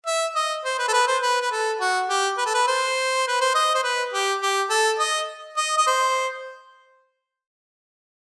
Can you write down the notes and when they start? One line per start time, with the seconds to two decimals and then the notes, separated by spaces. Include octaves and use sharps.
0.06 E5
0.36 D#5
0.65 C5
0.79 B4
0.88 A4
0.93 B4
1.07 C5
1.23 B4
1.41 B4
1.51 A4
1.80 F#4
2.09 G4
2.38 B4
2.46 A4
2.54 B4
2.67 C5
3.28 B4
3.41 C5
3.55 D#5
3.75 C5
3.83 B4
4.13 G4
4.42 G4
4.70 A4
4.99 D#5
5.57 D#5
5.78 D#5
5.87 C5